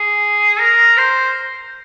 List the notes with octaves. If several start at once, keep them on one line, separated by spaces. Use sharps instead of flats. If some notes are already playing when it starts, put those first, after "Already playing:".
Already playing: G#4
A#4
C5